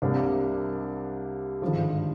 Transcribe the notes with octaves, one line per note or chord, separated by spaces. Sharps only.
C2 C3 G3 A#3 D4
G#1 G2 D3 F3 G#3